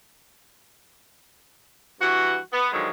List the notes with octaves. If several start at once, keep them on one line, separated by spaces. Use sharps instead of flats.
G2 E3 F#4
B3
D3 D#3 F3 F#3 G#3